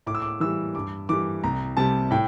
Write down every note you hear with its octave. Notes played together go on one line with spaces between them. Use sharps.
A2 D6
E6
D6
E3 G3 E6
G2 D6
E3 G3 D6
C2 A#5
C3 G3 A5
A2 G5